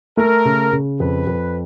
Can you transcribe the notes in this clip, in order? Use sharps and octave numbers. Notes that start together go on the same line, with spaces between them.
A3 A#4
C#3
C#3
F2 B4
F2